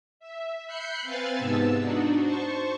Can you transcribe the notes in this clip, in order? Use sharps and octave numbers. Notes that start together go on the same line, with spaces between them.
E5
B5 F#6 G6 C7 C#7
C4 B4 F5 G#5 A6
G#2 C3 B3 A5 E6
D4 D#4 F#4
C5 A5 C#6